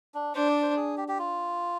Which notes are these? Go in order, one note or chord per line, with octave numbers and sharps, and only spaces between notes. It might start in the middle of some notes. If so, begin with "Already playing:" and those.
D4
D4 C5
D5
C5
G#4
G4
G4
F4